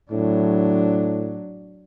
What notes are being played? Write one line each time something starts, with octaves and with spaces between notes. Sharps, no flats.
A2 F#3 D4